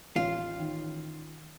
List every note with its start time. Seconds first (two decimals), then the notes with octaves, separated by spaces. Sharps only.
0.16 A1 F4
0.59 D#3